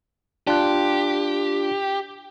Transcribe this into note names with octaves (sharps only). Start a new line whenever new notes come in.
D4 F4 G4 F#6